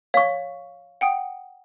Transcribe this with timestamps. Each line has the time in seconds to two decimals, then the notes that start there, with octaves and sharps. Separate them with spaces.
0.14 C#5 F5 C#6
1.01 F#5 G5 D#6